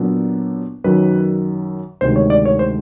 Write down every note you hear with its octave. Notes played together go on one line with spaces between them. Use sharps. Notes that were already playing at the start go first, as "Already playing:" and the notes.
Already playing: A#2 F#3 B3 D4
F#2 D#3 F#3 B4
D2 C3 D#3 G#3 C5
C#5
D5
C#5
C5